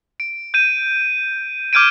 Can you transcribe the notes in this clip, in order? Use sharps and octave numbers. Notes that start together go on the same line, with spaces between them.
D7
G6 D#7
D6 F6 G6 G#6 D7 D#7